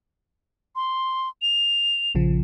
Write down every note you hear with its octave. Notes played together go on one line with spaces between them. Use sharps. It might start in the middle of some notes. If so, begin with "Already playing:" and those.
C6
F7
A#1 C#3 F3